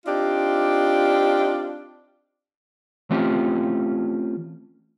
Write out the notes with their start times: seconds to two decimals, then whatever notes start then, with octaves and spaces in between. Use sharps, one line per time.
0.05 C4 D4 D#4 F4 G4
3.10 E3 A3 C4 C#4 F4 G4